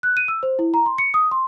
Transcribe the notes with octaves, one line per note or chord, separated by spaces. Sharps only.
F#6
D#7
E6
C5
E4
A#5
C6
C#7
D#6
C6